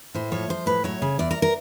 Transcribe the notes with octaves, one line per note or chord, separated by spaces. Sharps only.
A2 C5
F3 C#5
F3 C5
A2 B4
F#3 C#5
C#3
E2 D5
A#4
A#4